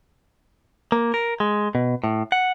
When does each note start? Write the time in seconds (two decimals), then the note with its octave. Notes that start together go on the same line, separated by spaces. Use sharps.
0.92 A#3
1.14 A#4
1.40 G#3
1.75 B2
2.04 A2
2.32 F#5